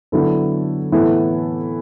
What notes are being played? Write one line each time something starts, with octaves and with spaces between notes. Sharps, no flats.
D3 F#3 B3 E4 A4
A2 E3 B3 E4 A4